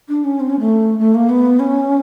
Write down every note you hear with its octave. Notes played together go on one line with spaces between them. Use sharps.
D4
C#4
C4
C#4
A3
A3
A#3
B3
C#4